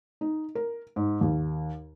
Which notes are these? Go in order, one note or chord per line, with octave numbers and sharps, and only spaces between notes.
D#4
A#4
G#2
D#2